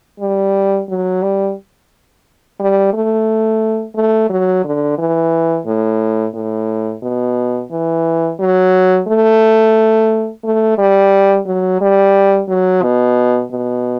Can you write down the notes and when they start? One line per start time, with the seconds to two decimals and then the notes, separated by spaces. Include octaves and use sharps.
0.20 G3
0.89 F#3
1.23 G3
2.60 G3
2.94 A3
3.95 A3
4.30 F#3
4.64 D3
4.98 E3
5.66 A2
6.34 A2
7.02 B2
7.71 E3
8.40 F#3
9.08 A3
10.44 A3
10.78 G3
11.47 F#3
11.81 G3
12.49 F#3
12.83 B2
13.51 B2